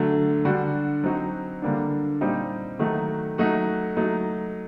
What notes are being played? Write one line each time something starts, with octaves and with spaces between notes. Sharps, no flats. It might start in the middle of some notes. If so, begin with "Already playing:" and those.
Already playing: D3 F#3 A3
D3 G3 D4 F#4
F#3 C4 D#4 F#4
D3 G3 A#3 D4
A#2 G3 C4 D#4
D#3 F#3 A3 D#4 F#4
F#3 A3 D#4 F#4
F#3 A3 D#4